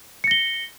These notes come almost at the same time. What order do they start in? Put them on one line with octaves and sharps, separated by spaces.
C#7 A#6 G7